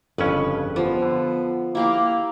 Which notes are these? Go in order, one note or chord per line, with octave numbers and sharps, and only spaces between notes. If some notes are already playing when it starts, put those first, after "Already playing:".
G1 F2 C#3 C#4 B4
F3 B3
D3
A#3 E4 G4 F5